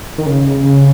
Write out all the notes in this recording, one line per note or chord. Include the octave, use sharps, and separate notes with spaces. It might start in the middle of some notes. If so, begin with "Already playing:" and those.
D#3
C#3